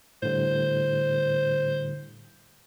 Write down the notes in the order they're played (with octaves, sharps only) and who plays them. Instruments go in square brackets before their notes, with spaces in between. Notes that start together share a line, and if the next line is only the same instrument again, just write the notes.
[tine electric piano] A2 D3 G3 [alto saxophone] C5